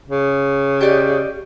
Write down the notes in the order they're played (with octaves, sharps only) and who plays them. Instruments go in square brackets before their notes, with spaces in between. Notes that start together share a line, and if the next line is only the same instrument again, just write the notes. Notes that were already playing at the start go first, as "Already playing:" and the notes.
[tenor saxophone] C#3
[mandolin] G4 D5 D#5